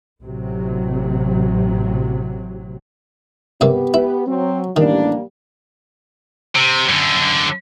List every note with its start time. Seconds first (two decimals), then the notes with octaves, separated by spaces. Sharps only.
0.22 A1 C3 F#3
3.61 G2 C3 A#3 B3 G4
3.94 E4 B4
4.27 F#3 C4
4.77 A1 D#3 G3 A#3 D4
6.55 C3
6.89 F#2 D3